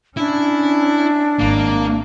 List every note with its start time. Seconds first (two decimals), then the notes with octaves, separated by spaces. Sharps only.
0.17 C#4 D4 E4
1.39 G#1 A#3